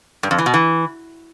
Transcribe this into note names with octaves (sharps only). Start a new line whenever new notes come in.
G2
F2
E3
B2
E3